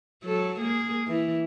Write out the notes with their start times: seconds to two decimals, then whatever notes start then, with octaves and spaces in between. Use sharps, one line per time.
0.24 F#3 A4
0.61 A#3 G#4
1.07 E3